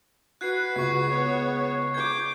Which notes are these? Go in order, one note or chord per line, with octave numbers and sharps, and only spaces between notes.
F#4 B4 F#6 G#6 C7
C#2 C#6 G#6 C7
B3 C#5
D6 G6 G#6